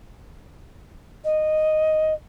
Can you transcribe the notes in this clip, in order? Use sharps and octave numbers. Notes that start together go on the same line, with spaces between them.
D#5